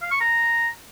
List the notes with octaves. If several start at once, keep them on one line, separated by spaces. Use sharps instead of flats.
F5
C#6
A#5